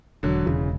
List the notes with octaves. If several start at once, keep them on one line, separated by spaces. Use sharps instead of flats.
E1 D3 F#3
E1 C#3 E3